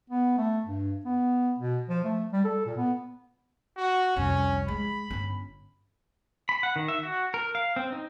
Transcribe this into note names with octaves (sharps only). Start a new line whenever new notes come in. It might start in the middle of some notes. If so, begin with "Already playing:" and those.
B3
A3
G2
B3
B2
F3
A3
G3
A4
A#2
B3
F#4
C2 F2 C#4
G#3 B5
G1 C#4
B5
F#5
D#3
E5
F#4
A#4
F5
C4
D#4